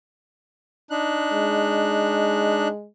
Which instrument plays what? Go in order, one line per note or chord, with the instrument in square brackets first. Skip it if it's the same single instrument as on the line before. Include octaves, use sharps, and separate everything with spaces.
[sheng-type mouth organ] D4 D#4 F#6
[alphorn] G#3